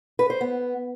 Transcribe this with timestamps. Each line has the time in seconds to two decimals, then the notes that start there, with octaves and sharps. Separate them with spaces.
0.19 B4
0.30 C5
0.41 B3